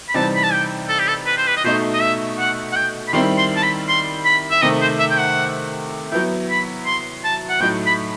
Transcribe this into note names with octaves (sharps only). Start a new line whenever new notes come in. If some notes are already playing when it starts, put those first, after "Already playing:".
B5
C3 E3 G3 C4 D#4 A5
B5
A5
G5
A4
G4
A4
B4
C5
B4
D#5
B2 A3 D#4 C5
D#5
E5
F#5
F#5
G5
B5
D#3 G3 C4 E4 C6
C6
A5
B5
C6
B5
E5
C3 D#3 A3 D#5
C5
E5
G5
F#5
F#3 B3 E4 G5
B5
C6
A5
F#5
A2 F#3 A3 D#4 G5
B5